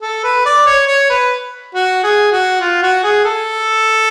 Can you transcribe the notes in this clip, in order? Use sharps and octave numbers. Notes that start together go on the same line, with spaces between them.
A4
B4
D5
C#5
C#5
B4
F#4
G#4
F#4
F4
F#4
G#4
A4